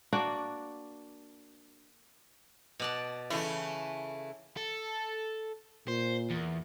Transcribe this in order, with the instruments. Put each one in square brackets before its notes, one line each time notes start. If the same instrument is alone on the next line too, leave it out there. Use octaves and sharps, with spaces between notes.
[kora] A#3 D4 F#4
[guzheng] B2 D5 A5
[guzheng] C#3 [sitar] E3 A3 E4
[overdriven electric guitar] A4
[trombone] A#2 [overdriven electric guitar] C5
[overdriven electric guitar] E2